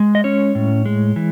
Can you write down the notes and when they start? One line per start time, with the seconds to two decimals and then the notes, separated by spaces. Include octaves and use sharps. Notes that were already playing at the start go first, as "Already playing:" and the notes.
Already playing: G#3
0.15 D#5
0.24 C#4 C#5
0.55 A2
0.86 G#3
1.16 E3